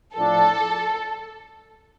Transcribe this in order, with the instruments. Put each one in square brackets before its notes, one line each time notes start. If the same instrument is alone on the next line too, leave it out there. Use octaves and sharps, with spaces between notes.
[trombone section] A2 F3 D4 [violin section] A4